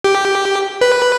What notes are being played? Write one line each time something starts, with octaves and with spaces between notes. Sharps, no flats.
G4
B4